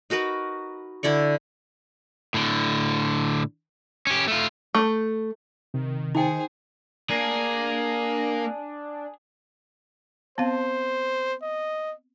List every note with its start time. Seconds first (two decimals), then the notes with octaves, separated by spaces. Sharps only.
0.10 D#4 F#4 A#4 B4
1.03 D3 E4 D5 C#6
2.34 A2 D3
4.07 C#4 G4
4.28 A3 F4
4.75 A3
5.74 C3 D#3
6.15 D#3 D#4 G#4 C5 G5
7.10 A#3 D4 G#4
10.38 B3 C4 C5 F5
11.42 D#5